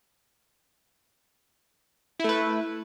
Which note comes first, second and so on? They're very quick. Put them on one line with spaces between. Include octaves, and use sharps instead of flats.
E4 A3 B4